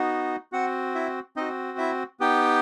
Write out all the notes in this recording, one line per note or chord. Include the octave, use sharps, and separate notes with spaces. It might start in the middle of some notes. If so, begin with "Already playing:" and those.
Already playing: B3 D#4 F#4
C4 F#4 F#5
E4 E5
C4 D#4 F#4 D#5
E4 E5
B3 D#4 G4 G5